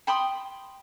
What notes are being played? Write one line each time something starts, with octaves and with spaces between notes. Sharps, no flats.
G5 B5 C6 D#6